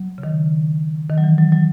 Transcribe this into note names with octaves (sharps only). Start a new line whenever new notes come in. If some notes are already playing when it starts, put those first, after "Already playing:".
Already playing: F#3
C#3
D#3
D#3
F#3
E3
F#3
F#3